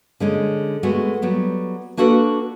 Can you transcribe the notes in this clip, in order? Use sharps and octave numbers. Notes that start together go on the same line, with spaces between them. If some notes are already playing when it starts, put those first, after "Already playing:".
D3 G#3 C#4
G#3 A3 B3 F#4
F#3 G3 B3
A#3 D4 F#4 A4 B4